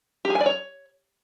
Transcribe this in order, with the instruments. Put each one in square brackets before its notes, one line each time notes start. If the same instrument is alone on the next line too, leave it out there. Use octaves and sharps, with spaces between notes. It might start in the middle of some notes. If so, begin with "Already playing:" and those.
[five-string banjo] G4
G#4
G#5
D5
C#5